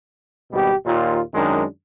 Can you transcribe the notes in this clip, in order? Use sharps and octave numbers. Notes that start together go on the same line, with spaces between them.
G#1 B2 G3 G4
D#2 A#2 F4
F#2 D#3 G#3 D4